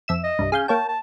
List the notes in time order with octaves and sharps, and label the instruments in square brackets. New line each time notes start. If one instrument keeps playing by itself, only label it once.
[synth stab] F2 E5 E7
[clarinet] D#5
[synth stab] C2 G2
[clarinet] C#4 [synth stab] G#4 F5 G6
[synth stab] A#3 C#5 G5 [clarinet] A5
[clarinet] A5